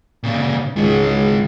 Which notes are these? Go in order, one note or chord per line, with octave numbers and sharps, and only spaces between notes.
A#2 C#3
C#2 D#3 G#3